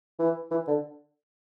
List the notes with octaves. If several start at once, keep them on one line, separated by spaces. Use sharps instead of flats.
E3
E3
D3